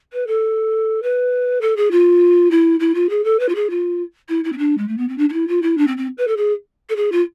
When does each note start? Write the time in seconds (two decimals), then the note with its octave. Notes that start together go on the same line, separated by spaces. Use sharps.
0.13 B4
0.27 A4
1.02 B4
1.61 A4
1.76 G#4
1.91 F4
2.50 E4
2.80 E4
2.94 F4
3.09 G#4
3.24 A4
3.39 B4
3.49 F4
3.55 G#4
3.70 F4
4.29 E4
4.44 E4
4.52 C4
4.58 D4
4.77 G#3
4.88 A3
4.97 B3
5.08 C4
5.18 D4
5.29 D4
5.33 E4
5.48 F4
5.62 E4
5.77 D4
5.87 C4
5.97 C4
6.18 B4
6.27 A4
6.36 G#4
6.89 A4
6.96 G#4
7.12 F4